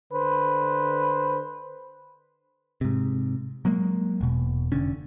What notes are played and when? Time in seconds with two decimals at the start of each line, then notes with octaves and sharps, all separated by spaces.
0.12 D3 B4 C5
2.81 G#2 C3
3.65 F#3 G#3 A#3
4.21 E1 B2
4.72 F1 D3 C#4